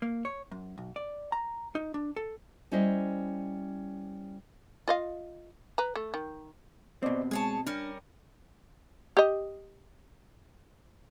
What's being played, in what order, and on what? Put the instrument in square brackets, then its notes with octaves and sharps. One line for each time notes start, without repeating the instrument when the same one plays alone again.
[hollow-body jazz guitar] A#3
C#5
F#2
B1
D5
A#5
D#4
D4
A4
[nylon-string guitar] G3 C#4 E4 C5 D#5
[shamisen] F4 D#5 F5
B4 A#5
A3
D#3
[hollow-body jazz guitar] B2 C4 [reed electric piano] C5 D5 D#5
[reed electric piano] G#3 [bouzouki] G#4 C#5 A5
[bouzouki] G3 C#4 A#4 [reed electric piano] D4
[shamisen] G4 D#5